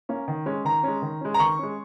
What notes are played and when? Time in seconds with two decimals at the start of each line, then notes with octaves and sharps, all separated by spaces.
0.09 A#3 C#4
0.28 D#3
0.46 G#3 C#4
0.64 D#3 A#5
0.83 G#3 C#4
1.02 D#3
1.21 G#3 C#4
1.34 A#5
1.39 D#3 C#6
1.59 G#3 C#4